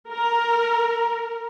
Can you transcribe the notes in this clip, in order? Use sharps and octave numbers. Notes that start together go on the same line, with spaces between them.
A#4